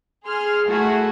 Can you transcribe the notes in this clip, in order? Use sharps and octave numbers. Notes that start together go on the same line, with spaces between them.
G#4 C6 F6
A3 E4 F#4 G#4 A4